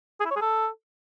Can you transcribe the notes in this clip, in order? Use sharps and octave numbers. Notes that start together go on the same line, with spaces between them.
G#4
E4
C#5
G#4
A4